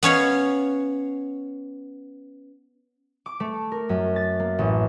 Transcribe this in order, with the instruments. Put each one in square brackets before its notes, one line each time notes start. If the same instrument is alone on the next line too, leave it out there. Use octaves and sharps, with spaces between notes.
[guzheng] B3 C#4 C#5 F5
[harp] D6
A3
A#4
F#2
A6
A#3
A1